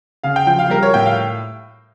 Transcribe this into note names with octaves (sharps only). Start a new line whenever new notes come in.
C#3 F5
G5
F3 G5
F5
G3 A#4
C#5
A2 G5
F5